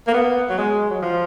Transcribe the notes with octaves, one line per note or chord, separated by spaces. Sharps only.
A#3
B3
F#3
G#3
F#3
F3